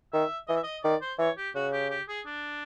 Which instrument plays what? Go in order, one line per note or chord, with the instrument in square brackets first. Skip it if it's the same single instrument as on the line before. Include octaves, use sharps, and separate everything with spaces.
[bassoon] D#3 [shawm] E5
[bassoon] E3 [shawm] D#5
[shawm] E5
D#5
[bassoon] D#3 [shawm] D5
[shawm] C5
[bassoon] E3 [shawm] C#5
[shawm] G4
[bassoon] C#3 [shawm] F#4
[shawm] G4
G4
G#4
D4